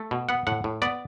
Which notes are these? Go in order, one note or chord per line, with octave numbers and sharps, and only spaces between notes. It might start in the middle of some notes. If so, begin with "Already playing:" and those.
Already playing: A3
B2
B3 F#5
A2 F#5
A2
B3 D5